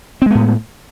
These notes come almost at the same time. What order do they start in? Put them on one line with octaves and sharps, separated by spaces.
C4 G#3 B3 A2